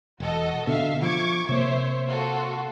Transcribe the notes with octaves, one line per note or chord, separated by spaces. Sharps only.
E1 F#4 A4 D#5
B2 D3 E5 F5
F3 C#6 D6 G#6
C3 A#3 C5 C#5 E5
F4 F#4 A4